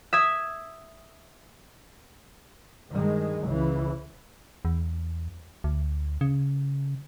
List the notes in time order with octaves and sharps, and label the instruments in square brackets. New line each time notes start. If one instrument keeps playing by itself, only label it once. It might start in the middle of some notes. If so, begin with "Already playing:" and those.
[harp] E5 D#6 G#6
[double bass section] G2 D#3 G#3
C#2 C#3 E3
[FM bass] E2
D2
C#3